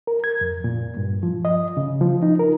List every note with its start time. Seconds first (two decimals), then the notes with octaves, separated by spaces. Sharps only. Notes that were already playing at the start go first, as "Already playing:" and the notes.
0.07 A#4
0.24 G#6
0.41 F2
0.64 A#2
0.97 G2
1.23 F3
1.45 D#5
1.77 C#3
2.01 F3
2.23 D#4
2.39 A#4